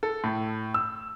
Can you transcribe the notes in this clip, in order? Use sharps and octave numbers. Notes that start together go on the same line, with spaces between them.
A4
A2
E6